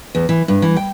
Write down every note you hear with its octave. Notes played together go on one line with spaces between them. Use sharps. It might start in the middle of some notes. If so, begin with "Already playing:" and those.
E2
E3
G2
E3
G5